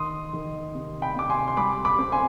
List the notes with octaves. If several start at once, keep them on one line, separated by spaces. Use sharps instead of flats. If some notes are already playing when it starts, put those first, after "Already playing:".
Already playing: D#3 C6 D#6
D#3
C3
G5 B5
C3 D6
G#5 C6
C6
G3 B5 D6
B5 D6
C4
G#5 C6